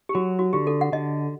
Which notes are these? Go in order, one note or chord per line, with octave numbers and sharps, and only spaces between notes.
G4
F#3 F#4
F#4
D3 G4
A4
F#5
D3 D#5